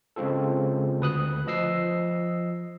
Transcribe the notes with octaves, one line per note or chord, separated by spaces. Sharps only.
C#3 G#3 C4 F4 A4
D2 B4 D#6 F#6
F3 D#5 E6 C7